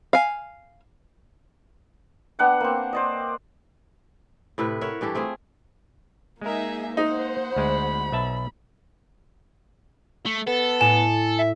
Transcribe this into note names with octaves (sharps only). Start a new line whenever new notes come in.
F5 G#5
B3 D4 F#5 G5
A#3 C4
C5 D5 D#5
A2 C3 E4 B4
A#4 C#5 E5 F#5
G2 E3 G4 A4
A3 C4 F4 G#4
G#3 A#3 D#4 G#4 A#4 E5
D#4 C5 F#5
D2 G#3 B5
B1 E5 A5
A3
B3 A4
A2 G#5 E7
E5